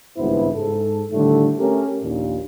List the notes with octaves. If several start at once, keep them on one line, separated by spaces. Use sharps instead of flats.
G#1 C#2 G2 B3 E4 C5
G#2 A4
A2 D3 D#3 G3 A3
A3 C#4 G4 A4 A#4
A#1 D#2 A#2